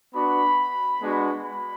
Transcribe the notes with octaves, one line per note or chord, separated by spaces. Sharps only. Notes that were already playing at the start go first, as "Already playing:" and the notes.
B3 D4 F#4 B5
G#3 B3 D4 F#4
B5